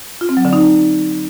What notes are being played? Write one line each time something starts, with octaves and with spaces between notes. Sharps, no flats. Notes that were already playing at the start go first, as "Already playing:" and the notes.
F4
C4
F#3
D3
D#4